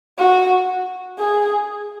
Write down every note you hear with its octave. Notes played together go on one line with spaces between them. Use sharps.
F#4
G#4